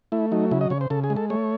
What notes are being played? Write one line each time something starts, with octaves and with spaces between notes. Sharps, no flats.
A3 E4
F#3 D#4
C#3 E4
D#5
C#3 C#5
C5
C#3 A4
G#4
G#3
A4
A3 C#5